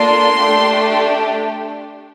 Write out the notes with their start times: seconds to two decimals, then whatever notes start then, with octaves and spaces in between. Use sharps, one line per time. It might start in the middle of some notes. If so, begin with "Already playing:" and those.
Already playing: A#3 D4 F4 A4 C6
0.37 A3 D4 G4